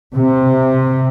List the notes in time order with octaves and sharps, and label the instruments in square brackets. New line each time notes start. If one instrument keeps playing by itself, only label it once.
[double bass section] C3